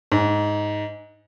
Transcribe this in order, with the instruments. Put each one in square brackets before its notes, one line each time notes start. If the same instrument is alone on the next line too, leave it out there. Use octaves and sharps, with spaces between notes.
[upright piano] G#2